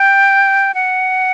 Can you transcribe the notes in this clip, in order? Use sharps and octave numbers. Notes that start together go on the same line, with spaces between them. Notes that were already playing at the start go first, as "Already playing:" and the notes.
Already playing: G5
F#5